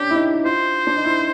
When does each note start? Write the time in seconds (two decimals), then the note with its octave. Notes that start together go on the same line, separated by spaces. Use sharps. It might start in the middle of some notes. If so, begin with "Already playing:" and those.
Already playing: C#4 D4 G4
0.11 E4
0.15 D#4
0.45 F4 C5
0.87 D4
0.97 D#4
1.05 E4